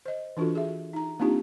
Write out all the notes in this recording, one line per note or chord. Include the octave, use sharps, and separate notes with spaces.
C5 D#5
E3 D4 F4 F#4 A4
G#4 E5
D#4 A#5
A#3 C4 D4 D#4 F4 G4